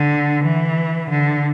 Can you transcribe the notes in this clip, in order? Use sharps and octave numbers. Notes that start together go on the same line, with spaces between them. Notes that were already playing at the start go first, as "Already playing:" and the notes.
Already playing: D3
E3
D3